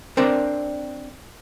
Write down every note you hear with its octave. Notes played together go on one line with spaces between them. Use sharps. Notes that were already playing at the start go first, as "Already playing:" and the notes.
C4 D4 A#4 C5 D5